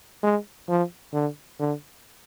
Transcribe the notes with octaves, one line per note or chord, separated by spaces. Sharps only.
G#3
F3
D3
D3